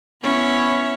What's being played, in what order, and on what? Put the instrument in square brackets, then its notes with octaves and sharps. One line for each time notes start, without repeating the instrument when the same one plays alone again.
[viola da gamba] B3 E4 C#5 [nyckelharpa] C#4